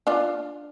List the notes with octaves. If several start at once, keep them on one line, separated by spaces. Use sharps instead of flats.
D4 F4